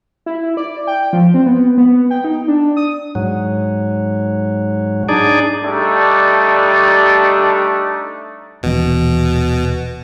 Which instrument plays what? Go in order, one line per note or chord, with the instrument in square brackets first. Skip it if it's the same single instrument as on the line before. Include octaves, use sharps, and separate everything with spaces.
[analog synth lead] E4
D5
G5
F3
C4
B3
B3
G5
D#4
D4
D#6
[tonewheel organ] G#2 F#3
D4 D#4 G#4 D5
[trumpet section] G3 A3 D4 D#4 A4
[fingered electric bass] D#1 E3 [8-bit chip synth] B2